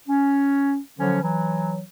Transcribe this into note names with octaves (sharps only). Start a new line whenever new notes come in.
C#4
D3 F3 F#3 C#4
E3 F#3